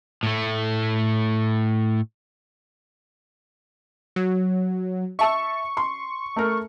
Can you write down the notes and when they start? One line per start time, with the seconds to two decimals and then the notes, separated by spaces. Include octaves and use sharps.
0.23 A2 A3
4.16 F#3
5.19 E5 A5 C#6 E6
5.77 C6
6.36 A3 A4 A#4